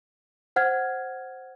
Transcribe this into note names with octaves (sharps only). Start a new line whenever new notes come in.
C5 F#5 F6 G#6